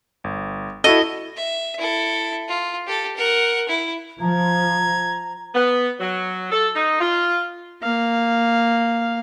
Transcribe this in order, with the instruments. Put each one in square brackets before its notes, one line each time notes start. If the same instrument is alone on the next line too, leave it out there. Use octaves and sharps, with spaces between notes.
[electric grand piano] G1
[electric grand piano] E4 F#4 A4 [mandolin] D#5
[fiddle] E5
E4 A4
F4
G4 A4
A#4 F#5
E4
[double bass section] F3 [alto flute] A#5 [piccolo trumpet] G#6
[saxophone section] B3
F#3
A4
D#4
F4
[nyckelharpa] A#3 F5